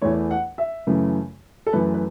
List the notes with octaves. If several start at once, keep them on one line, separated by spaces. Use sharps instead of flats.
E2 E3 A3 C#5
F#5
E5
F#2 C#3 E3 A3
A4
F#2 E3 A3 B4
B4